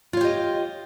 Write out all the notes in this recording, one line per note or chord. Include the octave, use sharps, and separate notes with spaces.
F4 G4 C#5 D#5